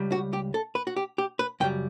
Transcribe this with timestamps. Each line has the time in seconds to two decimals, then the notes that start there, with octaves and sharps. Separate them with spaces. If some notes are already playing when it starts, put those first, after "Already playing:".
Already playing: C#2 G3
0.12 F#4
0.33 G4
0.54 A4
0.75 B4
0.87 F#4
0.96 G4
1.18 G4
1.39 B4
1.60 F#2 C#3 G3 G5